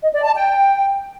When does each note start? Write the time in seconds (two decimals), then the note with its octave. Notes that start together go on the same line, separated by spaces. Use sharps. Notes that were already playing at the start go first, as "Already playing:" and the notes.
0.02 D#5
0.13 D5
0.23 A5
0.34 G5